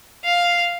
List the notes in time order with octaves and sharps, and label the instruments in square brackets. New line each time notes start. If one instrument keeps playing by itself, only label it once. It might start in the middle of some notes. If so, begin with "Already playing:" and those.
[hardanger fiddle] F5